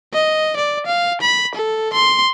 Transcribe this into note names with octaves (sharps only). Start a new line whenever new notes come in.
D#5
D5
F5
B5
A4
C6